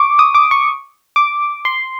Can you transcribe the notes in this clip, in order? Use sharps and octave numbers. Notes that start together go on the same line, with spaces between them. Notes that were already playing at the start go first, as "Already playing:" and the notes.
Already playing: C#6 D6
D#6
D6
C#6
D6
C6